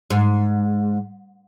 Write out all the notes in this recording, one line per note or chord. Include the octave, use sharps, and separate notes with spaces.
G#2